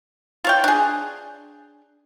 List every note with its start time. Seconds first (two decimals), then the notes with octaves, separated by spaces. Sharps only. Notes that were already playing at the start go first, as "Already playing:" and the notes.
0.44 F4 C#5 G5
0.64 D4 G#4